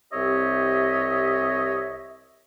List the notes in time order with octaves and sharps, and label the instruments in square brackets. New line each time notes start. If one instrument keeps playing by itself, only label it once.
[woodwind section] C2 C4 G4 C#5 D#5 E5